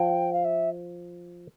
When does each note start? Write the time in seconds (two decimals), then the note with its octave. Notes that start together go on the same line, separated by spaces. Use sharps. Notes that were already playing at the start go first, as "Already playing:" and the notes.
Already playing: F3 G5
0.33 F5
0.45 E5